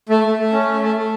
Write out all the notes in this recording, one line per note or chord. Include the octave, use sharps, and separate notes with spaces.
A3
A3
A3
C#4
A3
A3
A3